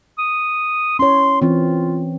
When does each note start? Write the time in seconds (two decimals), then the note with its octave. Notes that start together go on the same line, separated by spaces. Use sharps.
0.18 D#6
0.99 C#4 E4 C#5 C6
1.42 E3 C4 F4